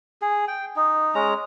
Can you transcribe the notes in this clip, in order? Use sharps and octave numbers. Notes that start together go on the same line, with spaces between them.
G#4
G5
D#4
G#3 C#4 A#5